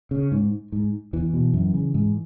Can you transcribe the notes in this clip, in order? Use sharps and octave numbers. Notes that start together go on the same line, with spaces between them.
C#3
G#2
G#2
E2 E3
B2
F#2
C#3
G#2